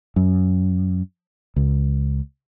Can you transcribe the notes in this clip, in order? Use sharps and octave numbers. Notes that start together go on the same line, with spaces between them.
F#2
C#2